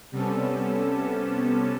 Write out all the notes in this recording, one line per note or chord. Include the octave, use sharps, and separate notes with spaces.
C3 G3 B3 C#4 A4